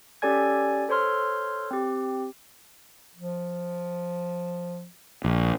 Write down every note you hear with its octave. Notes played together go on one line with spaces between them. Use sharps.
C#4 G4 A4 D5 G#5 G#6
A4 C5 C#5 C6 F6
C4 G4
F3
A#1